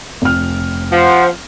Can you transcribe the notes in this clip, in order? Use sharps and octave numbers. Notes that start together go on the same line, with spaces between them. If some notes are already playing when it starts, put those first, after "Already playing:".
F1 F6
F3 C5 F#5